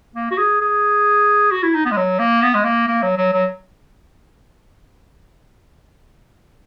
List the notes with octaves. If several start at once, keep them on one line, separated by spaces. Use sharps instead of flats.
A#3
F#4
G#4
G#4
F#4
E4
D#4
B3
G#3
F#3
A#3
B3
G#3
A#3
A#3
F#3
F#3
F#3